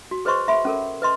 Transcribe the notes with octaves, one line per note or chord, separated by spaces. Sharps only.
F#4
G#4 B4 C5 D#5 C6 C#6
E5 B5 C6
C#4 A4 A#4
B4 D#5 C6